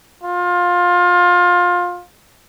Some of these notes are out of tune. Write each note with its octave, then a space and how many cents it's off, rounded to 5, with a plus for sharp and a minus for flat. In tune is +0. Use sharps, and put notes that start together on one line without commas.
F4 +20